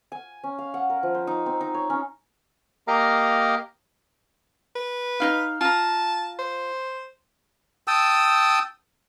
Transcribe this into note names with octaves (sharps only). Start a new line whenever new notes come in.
G#5
C#4
F5
F#5
A#4
F3
C5
D#4
C4
D#4
C#5
C#4
A#3 G4 A#4 D#5 F5 A#5
B4
D#4 E4 F5
F4 A5 A#5
C5
G5 A5 D#6 E6